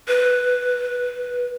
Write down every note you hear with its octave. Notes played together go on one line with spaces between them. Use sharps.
B4